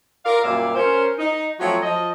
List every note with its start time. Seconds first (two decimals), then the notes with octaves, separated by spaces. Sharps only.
0.25 A#4 D5 F5
0.43 F#2 A#2 G3 D5 E5 F5
0.75 C#4 A#4 C5
1.19 D#4
1.60 F3 F#3 A3 C4 F4 F#4
1.82 F3 D#5